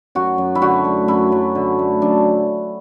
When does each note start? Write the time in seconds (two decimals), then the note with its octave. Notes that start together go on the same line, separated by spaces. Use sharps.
0.15 F#2 F#4
0.38 F#2
0.55 E4
0.61 D3 F#4
0.84 A3
1.08 F#2 E4
1.32 F#2
1.55 D3
1.79 A3
2.02 F#2 D4